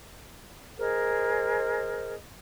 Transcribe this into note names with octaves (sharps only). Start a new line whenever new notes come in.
G#4 A#4 C5 D#5